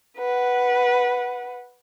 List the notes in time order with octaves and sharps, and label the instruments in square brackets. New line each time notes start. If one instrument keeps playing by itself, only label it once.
[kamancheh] B4 F#5